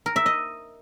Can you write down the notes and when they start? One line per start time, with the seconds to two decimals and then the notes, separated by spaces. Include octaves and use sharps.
0.06 A#4
0.16 E5
0.26 D#5